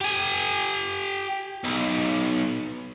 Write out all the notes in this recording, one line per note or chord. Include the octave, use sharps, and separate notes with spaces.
G4 G#5
B1